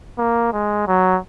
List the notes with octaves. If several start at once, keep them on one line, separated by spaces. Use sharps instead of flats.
A#3
G#3
F#3